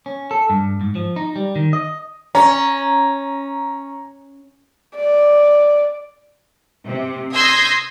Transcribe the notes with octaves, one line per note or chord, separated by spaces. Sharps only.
C#4
A4
G2
G#2
F3
D#4
G3
D#3
D#5
C#4 A#5
D5
C3
C6 D#6 E6 G6 G#6 A#6